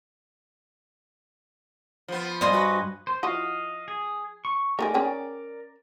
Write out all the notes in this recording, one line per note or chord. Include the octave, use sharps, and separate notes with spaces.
F3 B3
G2 C5 D5 D#5 G#5
F#4 B4
C5
F3 E4 F#4 D#5 F5
G#4
C#6
A3 D#4 G#4 A#4 D5
C#4 G#4 G5